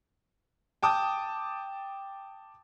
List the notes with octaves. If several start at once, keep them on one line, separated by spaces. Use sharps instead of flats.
G5 A5 D6 D#6